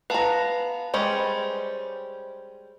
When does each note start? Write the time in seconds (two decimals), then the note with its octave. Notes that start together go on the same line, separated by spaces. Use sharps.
0.10 B3 B4 F5 A5 A#5
0.94 G3 G#3 C#4 C5